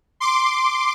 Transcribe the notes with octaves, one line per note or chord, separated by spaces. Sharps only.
C6 D6